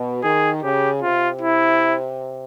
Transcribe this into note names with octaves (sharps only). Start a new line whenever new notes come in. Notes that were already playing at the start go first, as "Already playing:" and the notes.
Already playing: B2
D#3 G#4
C#3 G4
C3 F4
E4